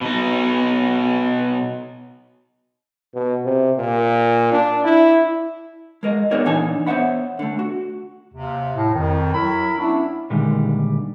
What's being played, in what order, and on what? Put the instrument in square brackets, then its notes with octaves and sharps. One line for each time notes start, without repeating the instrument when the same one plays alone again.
[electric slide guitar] B2 D#4
[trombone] B2
C3
A#2
D4
E4
[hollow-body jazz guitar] G#3 A#4 D#5
B3 D#4 G#4 A#4 C#5 D5
A#2 E3 D4 D#4 G#5
B3 C5 C#5 E5 F#5 B5
D3 A3
F#4
[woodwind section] D#2 C3
[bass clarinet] A2
[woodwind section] F2 [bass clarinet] D#3
[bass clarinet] F#3 [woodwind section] E4 A#4 B5
[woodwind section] B3 C#4 D4 [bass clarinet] E4
[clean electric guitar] A#2 D3 D#3 G3 G#3